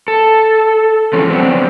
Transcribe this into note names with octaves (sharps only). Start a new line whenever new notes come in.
A4
E3 F3 G#3 C#4
F#3 B3 C4 D4